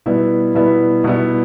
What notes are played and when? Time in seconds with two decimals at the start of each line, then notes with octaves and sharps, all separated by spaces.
0.06 B2 G3 B3 E4
0.55 B2 G3 B3 E4
1.04 B2 G3 B3 E4